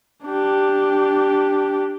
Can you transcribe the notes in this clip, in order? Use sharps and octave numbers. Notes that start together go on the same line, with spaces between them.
D4 G4